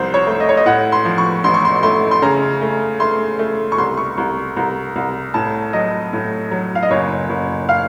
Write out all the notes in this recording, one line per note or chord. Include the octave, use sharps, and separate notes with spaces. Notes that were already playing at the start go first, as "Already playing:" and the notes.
Already playing: C2 F3 C5
C#5
A3
D#5
C#5
D#5
A2 F#5
C6
F3
C#6
A1 C6
C#6
C6
A3 C6
C6
C#3 A#5
A3
A3 C6
A3
C#6
C2 C6
C#6
C2
C2 A#5
C2
A2 A5
F#3 D#5
A2
F#3
F5
D#5
F#1 C#5
F#1
F5